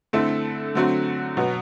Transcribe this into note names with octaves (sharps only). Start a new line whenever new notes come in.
D3 A3 C4 E4 A4
D3 F#3 A3 C4 F#4
B2 F#3 B3